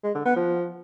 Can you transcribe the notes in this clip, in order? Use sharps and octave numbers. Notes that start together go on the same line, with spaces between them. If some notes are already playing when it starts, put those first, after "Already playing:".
G#3
D3
B3
F3